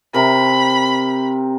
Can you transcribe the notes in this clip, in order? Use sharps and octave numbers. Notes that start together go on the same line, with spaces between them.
C3 C4 A#4 B5